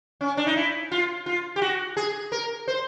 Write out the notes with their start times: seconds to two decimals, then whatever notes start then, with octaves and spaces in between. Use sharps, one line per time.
0.21 C#4
0.37 D4
0.47 D#4
0.56 E4
0.92 F4
1.26 F4
1.56 G4
1.62 F#4
1.97 G#4
2.32 A#4
2.68 C5